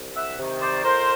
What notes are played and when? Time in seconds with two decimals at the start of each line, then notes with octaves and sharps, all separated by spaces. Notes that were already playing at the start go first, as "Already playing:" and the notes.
Already playing: C2
0.16 E5 F#5
0.38 C3 D#3
0.61 C5 D5
0.83 F2 A#4 C5